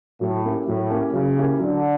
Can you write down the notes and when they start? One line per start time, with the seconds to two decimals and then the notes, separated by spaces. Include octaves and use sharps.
0.21 A2 F#3
0.44 A#3 C#4 E4 G4
0.67 A2 F#3
0.90 A#3 C#4 E4 G4
1.13 C#3 F#3
1.36 A#3 C#4 E4 G4
1.60 D3 F#3